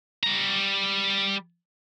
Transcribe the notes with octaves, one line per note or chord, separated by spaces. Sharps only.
G3 A#5